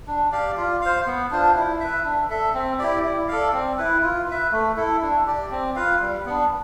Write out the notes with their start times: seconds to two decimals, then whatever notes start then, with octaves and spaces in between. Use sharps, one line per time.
0.08 D4
0.32 G4 D5 F5
0.57 F4
0.82 C5 F5
1.06 B3
1.31 D4 F4 C5
1.55 E4
1.80 B4 E5
2.05 D4
2.30 A4 E5
2.54 C4
2.79 E4 G4 D5
3.04 E4
3.28 A4 D5 F5
3.53 C4
3.78 E4 B4
4.02 F4
4.27 B4 E5
4.52 A3
4.77 E4 A4
5.02 D4
5.26 G4 D5
5.51 C4
5.76 F4 B4 F5
6.00 G3
6.25 B3 D4